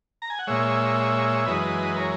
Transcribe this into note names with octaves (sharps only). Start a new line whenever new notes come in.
A#5
G#5
F#5
A#2 G#3 C#5 E5
F#2 E3 G#3 B4 D#5
A#4 C#5